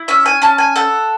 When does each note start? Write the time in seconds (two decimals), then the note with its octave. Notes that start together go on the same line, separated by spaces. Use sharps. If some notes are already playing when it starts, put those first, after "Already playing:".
Already playing: E4
0.08 C#4 E5
0.26 G#5
0.42 C#4 A5
0.58 G#5
0.76 A4 F#5